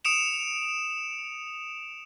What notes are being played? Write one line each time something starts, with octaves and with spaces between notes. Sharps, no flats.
D#6 C#7 D7 E7 F7